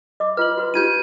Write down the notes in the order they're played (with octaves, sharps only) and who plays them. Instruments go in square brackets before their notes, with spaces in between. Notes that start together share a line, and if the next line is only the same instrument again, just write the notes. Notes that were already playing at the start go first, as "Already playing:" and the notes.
[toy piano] D#5 D6
[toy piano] F4 B4 [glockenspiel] F6 F#7
[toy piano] F#4 B4
[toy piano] D#4 F4 G4 [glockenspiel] G6 G#6 D#7